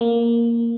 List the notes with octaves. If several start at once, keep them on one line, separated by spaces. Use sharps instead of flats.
A#3